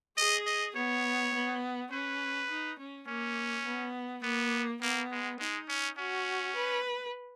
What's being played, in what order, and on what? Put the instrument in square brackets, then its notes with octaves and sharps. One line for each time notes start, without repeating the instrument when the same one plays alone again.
[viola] G#4 [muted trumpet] D#5
[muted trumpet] D#5
[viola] B3 [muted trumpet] C#5
[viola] B3
[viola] C#4 [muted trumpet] B4
[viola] D#4
C#4
[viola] A#3 [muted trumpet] C#4
[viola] B3
[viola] A#3 [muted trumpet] B3
[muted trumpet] A#3 [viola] B3
[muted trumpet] G#3
[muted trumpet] G#3 [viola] D#4
[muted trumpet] C#4
[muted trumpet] C#4 [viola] F#4
[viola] B4